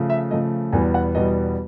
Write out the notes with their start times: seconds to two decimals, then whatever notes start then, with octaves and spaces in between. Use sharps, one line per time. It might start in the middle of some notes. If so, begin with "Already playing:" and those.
Already playing: C#3 F3 A3
0.10 E5
0.31 C#3 F3 A3 D#5
0.72 E2 B2 G3 B3 G#5
0.94 F#5
1.15 E2 B2 G3 B3 D#5